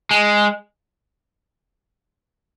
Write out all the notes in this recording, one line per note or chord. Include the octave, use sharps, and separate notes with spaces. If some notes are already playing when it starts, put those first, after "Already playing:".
G#3